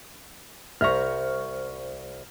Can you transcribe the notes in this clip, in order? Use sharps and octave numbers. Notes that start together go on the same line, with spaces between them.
C2 C5 E5 A#5 C#6 F6